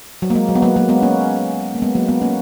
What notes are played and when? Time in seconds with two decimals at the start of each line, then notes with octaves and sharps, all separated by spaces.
0.22 F#3
0.30 A#3
0.35 G#3
0.49 F#3
0.55 B3
0.62 F#3 A#3
0.76 F#3 A#3
0.89 G#3 B3
1.02 A#3 C#4
1.75 A#3
1.82 G#3 B3
1.95 F#3 A#3
2.08 G#3 B3
2.21 A#3 C#4